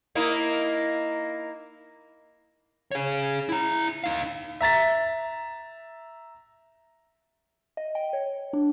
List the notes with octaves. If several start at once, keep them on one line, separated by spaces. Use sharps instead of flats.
A#3 D#4 E4
G#4 C#5
E4 A#5
D#4 F5
E5 A#5 A6 B6
D#5
G5
C#5
D4